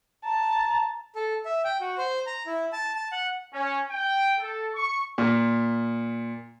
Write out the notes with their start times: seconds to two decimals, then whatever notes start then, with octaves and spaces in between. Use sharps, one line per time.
0.25 A5 A#5
1.15 A4
1.45 E5
1.65 G5
1.81 F#4
1.98 C5
2.27 A#5
2.46 E4
2.73 A5
2.95 A5
3.12 F#5
3.54 C#4
3.90 G5
4.39 A4
4.75 C#6
5.18 A#2